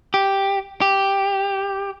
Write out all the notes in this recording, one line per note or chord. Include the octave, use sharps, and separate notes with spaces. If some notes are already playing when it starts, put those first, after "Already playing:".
G4
G4